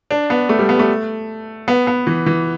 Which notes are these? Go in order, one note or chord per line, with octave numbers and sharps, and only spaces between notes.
D4
B3
A3
G3
B3
A3
B3
B3
E3
E3